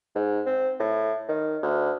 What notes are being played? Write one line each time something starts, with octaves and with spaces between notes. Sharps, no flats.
G#2
C4
A2
D#3
D2